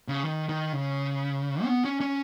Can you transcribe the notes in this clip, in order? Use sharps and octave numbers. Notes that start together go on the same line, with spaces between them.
C#3
D#3
D#3
C#3
C#4
B3
C#4
C#4